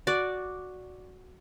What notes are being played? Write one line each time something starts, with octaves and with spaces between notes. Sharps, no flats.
F#4 D5